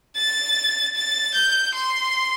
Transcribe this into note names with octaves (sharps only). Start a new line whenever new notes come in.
A6
A6
G6
C6